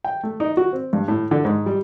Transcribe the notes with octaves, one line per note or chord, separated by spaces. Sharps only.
G5
A3
D#4
F#4
C4
G2
A2
D3
G#2
G3